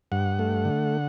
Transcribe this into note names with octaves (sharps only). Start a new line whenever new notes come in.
G2 F#5
A3
D3